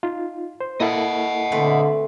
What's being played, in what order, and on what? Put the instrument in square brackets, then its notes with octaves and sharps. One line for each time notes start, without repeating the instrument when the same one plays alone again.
[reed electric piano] D#4 F4
C5
[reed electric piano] A#3 E4 A4 [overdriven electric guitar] D#5 F#5
[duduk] D3 [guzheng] A3 C4 B4